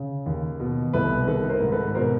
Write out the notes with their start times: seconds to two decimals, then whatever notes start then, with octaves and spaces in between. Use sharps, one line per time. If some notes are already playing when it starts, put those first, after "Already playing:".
Already playing: C#3
0.26 D#2
0.60 B2
0.93 C2 A4 B4
1.27 D#3 A4 B4
1.49 A#4 C5
1.60 G#2
1.72 A4 B4
1.95 B2 A#4 C5